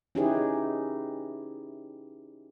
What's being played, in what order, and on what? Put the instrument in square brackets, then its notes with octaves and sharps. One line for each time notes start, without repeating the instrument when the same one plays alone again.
[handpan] C#4 D#4 E4 G4 G#4 B4